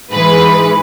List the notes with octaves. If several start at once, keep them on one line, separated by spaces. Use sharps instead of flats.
G#2 E3 G#3 B4